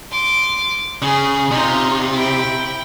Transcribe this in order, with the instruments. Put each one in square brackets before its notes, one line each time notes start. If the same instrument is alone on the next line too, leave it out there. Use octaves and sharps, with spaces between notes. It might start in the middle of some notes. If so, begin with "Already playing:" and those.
[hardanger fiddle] C6 D6
[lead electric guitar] C#3 [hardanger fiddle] G#4
[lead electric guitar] C3 [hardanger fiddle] D#4 F4
[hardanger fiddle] E4 G5